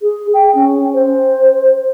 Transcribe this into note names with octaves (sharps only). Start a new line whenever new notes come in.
G#4
G5
C#4
C5